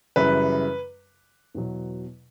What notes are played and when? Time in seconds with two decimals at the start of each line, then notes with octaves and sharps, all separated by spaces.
0.16 F#2 C#3 E3 G3 B4
1.54 E2 B2 F#3